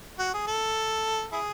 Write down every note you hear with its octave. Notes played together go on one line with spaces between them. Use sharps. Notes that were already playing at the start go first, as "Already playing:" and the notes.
F#4
G#4
A4
E4 G#4